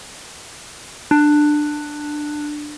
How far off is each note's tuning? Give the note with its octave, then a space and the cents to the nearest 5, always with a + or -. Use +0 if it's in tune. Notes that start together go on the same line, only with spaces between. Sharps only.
D4 +15